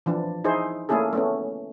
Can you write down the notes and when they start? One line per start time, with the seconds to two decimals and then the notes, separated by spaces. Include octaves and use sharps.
0.06 E3 F3 D4
0.44 D#4 E4 G#4 C5
0.89 A3 A#3 C#4 E4 G#4 A4
1.13 A3 B3 C#4